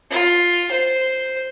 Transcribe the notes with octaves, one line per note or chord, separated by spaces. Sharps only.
F4
C5